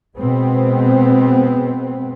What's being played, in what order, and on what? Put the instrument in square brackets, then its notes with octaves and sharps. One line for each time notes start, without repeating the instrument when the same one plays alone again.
[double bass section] B2 G#3 B3 C4